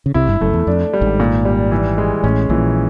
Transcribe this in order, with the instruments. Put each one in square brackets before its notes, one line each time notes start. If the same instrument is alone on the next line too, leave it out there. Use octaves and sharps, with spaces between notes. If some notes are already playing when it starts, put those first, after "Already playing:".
[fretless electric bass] C#3
[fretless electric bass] C2 C3 [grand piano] E4
[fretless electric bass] G1 G2
[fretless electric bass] F#1 F#2 [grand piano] A3
[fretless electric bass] E2
[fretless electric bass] F2 [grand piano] D4
[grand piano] G3
[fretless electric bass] G#1 G#2
[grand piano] A#2
G3
E3
G#3
[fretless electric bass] A1 A2 [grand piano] C#4
[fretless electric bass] A#1 A#2 [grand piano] E3